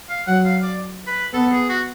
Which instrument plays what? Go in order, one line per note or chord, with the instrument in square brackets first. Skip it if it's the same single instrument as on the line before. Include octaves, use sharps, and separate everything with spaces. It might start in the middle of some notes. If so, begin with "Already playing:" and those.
[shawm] F5
[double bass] F#3 [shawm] F#5
[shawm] F5
D5
B4
[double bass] B3 [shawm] A4
[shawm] G#4
F#4